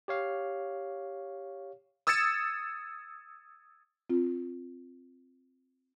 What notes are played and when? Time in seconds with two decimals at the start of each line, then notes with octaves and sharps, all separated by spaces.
0.08 G4 C#5 F5
2.07 D#6 E6 G#6 A6 C#7 E7
4.10 C4 F4